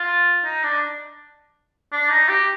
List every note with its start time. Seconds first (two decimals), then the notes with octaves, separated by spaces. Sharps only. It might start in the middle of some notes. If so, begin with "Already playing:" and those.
Already playing: F4
0.44 D#4
0.64 D4
1.92 D4
2.09 D#4
2.29 G4